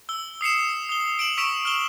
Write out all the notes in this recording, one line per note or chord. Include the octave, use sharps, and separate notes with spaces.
E6 G7
D#6 C7 C#7 E7
D#6 G7
D7 E7 F#7
C#6 E6 B6 D7 E7 F7
F6 E7 G7